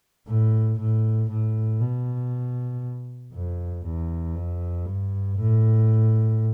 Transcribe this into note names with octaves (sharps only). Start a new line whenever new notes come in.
A2
A2
A2
B2
F2
E2
F2
G2
A2